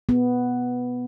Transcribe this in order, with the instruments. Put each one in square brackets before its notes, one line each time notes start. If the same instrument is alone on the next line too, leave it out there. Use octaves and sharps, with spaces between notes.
[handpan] B3